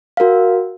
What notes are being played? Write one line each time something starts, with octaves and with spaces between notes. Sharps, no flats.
F#4 A#4 F5